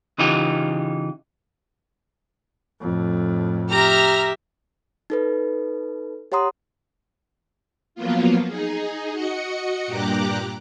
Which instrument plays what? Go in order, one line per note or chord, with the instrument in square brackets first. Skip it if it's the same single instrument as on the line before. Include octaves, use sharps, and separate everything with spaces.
[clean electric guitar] C#3 E3 D#4 F4 G4
[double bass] F2 A2
[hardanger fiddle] G4 E5 [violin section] A#5 F6 A#6
[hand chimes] D#4 A4 B4
G4 C#5 F#5 A#5 C6 D#6
[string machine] F3 F#3 A#3 B3 F4
D#4 G#4
F#4 D#5 C#7
G2 A#2 G4 A#5 D6 F#6